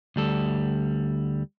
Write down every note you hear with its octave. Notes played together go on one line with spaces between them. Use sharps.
D2 G3 A4